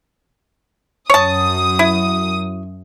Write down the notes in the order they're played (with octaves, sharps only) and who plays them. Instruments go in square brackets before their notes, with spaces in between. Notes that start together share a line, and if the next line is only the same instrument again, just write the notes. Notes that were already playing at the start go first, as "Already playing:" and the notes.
[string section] F#2 D#6 [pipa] C#5 A5
[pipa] E4